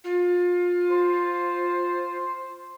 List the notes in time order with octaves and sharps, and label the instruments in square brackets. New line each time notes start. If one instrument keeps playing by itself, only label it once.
[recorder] F4
[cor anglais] C5